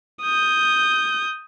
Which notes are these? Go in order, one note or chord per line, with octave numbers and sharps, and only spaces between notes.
D#6 G6